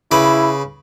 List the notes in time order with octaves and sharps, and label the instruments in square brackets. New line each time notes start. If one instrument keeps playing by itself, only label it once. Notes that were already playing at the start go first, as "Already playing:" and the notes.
[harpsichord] C#3 B4 D6 [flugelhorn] E4